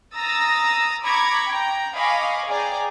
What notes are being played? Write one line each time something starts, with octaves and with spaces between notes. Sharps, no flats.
A#5 D#6 E6 A6 A#6
A#5 B5 C#6 D6 G#6
G5 A#5
D#5 F5 G#5 B5 C#6 D6
G#4 D5 G5 G#5 A#5